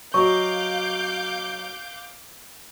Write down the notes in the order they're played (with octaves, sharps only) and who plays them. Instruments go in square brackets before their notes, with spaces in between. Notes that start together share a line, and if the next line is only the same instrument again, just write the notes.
[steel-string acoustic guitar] F#3 D#5 [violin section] F5 D6 G6 [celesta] C#6